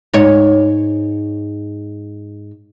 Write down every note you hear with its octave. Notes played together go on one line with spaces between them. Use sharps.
G#2 C#5